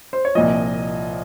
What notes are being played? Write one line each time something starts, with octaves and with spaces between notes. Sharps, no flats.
C5
C#5
C2 A#2 F3 D#5